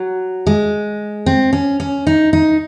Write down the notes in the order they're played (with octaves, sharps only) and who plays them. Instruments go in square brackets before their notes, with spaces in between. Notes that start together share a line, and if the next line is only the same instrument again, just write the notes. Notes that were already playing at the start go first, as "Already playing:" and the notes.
Already playing: [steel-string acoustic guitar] F#3
G#3
C4
C#4
C#4
D#4
D#4